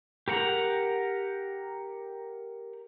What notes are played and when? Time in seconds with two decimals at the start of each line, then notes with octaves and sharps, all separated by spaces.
0.28 G4 A#4 F#5 A#5